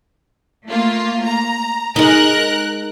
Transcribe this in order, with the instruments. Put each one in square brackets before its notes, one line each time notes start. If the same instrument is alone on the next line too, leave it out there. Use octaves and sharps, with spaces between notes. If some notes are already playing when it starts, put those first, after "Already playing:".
[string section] A3 A#3 F4
A#5
[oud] G#3 D#4 [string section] A#4 F#6